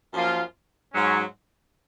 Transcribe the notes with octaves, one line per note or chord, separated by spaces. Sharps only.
F#2 F3 A#3 F4
G#2 F#3 C#4